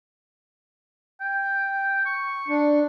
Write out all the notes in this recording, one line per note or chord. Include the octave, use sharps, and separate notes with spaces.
G5
C#6
D4